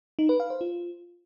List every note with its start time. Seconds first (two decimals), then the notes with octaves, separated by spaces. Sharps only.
0.19 D#4
0.29 B4
0.40 F5
0.50 C5
0.61 F4